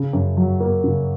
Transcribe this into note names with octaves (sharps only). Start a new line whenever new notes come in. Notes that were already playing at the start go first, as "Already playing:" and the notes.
Already playing: C#3
F#2
F#3
A#3
C#3